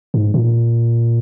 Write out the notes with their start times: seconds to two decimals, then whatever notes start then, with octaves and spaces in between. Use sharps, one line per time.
0.14 G#2
0.34 A#2